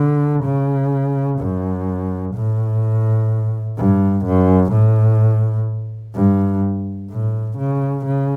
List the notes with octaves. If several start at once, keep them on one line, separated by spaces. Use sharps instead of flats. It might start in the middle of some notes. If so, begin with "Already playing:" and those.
Already playing: D3
C#3
F#2
A2
G2
F#2
A2
G2
A2
C#3
C#3